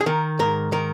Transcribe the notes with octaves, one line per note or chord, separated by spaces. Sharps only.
G#4
D#3 A#4
G#2 A#4
D#3 A#4